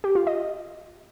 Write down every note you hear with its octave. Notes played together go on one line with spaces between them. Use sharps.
G4
F4
D#5